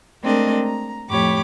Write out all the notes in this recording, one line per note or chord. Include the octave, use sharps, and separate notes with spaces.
G#3 A3 C4 D4 A#4 D#5
A#5
F2 A2 G4 C#5 B5 D6